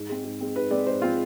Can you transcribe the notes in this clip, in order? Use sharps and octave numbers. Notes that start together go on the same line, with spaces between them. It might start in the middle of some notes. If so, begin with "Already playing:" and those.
Already playing: G#2
G#3 C4
G#2
G#3 C4
G#2 B4
G#3 C4 D5
G#2 C5
G#3 C4 F4